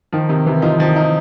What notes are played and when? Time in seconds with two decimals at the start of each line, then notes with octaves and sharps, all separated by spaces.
0.12 D#3 F3
0.29 C3 D#3
0.46 C3 E3
0.62 F3 D#4
0.79 D#3 F3
0.96 D#4